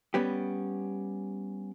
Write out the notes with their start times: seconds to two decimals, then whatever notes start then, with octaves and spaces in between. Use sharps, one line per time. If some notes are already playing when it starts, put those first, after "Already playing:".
0.14 G3 B3 C#4 G4